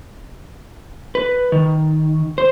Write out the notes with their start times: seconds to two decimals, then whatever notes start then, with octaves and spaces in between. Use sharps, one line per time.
1.15 B4
1.52 D#3
2.38 C5